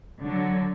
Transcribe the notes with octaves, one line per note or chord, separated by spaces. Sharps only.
D3 F#3